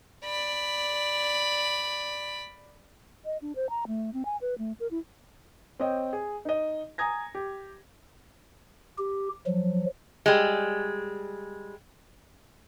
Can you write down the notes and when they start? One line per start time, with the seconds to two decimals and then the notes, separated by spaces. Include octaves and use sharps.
0.24 D5 B5
3.25 D#5
3.42 D4
3.56 C5
3.70 A#5
3.87 A3
4.13 C4
4.25 G#5
4.41 B4
4.58 A3
4.80 A#4
4.91 E4
5.80 C4 C#5 D#5 G5
6.13 G#4
6.45 D#4 D#5
6.98 G#5 A#5 D#6 G#6 A#6
7.35 G4
8.98 G4
9.47 F3 F#3
10.26 G3 G#3